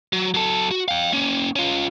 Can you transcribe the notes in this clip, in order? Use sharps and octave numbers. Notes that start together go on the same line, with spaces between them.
F#3
F#3 A4
F#4
F5 G5
A#3 C#4
C#4 F4